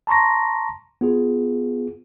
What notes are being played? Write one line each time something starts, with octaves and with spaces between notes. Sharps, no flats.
A5 A#5 C6 C#6 A#6
B3 F4 G#4